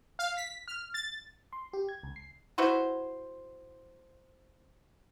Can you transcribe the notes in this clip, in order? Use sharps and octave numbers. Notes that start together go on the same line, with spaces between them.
F5
B6
F6
A6
C6
G4
G#6
C#2
C7
E4 F#4 B4 C5